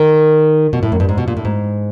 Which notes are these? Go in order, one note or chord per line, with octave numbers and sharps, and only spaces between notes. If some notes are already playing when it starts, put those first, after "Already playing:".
Already playing: D#3
B2
A2
F#2
G2
G#2
B2
A#2
A2
G#2